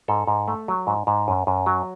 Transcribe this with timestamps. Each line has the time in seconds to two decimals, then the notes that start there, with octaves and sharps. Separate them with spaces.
0.08 G#2 A4
0.27 G#2
0.48 A3
0.68 F#3
0.87 G#2
1.07 G#2
1.28 F#2
1.47 F#2
1.66 F#3